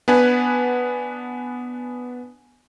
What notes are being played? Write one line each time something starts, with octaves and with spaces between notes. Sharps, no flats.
B3 D4 B4 F#5 G#5